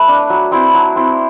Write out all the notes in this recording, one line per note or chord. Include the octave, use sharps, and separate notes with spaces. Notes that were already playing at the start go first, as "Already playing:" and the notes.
Already playing: A3 E4 B4
D4
F#3
C4 E4
F#3
C4 E4